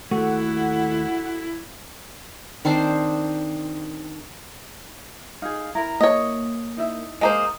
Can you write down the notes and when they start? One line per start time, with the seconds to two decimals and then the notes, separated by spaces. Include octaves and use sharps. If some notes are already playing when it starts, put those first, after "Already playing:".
0.11 D#2 A3 E4 F#4 A4 F#5 C#6
2.65 D#3 C4 D4 C5
5.42 D#4 G#4 F5
5.75 E4 A#4 A#5 B5
6.01 A#3 C#5 D#5
6.77 D#4 E4 E5
7.21 G#3 A#3 C5 D#6